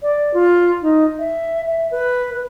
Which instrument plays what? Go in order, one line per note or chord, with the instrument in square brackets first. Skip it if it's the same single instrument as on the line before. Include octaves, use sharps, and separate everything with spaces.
[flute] D5
F4
D#4
E5
E5
B4
B4